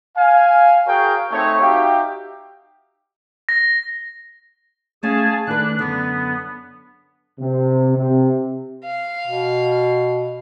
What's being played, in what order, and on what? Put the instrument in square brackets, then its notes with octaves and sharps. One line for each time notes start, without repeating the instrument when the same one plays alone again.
[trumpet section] F5 G#5
F#4 G#4 A#4 C#5 F5 G5
A3 C4 D#4 C#5
D#4 F#4 G4 E5 F5 G5
[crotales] A#6
[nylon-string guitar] A3 C#4 F5 [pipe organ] G#4 G#5 A5
[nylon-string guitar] D#3 A3 B4 [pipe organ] D4 F#6
[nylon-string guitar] F#2 D3 [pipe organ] B3
[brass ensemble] C3
C3
[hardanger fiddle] F5
[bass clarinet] B2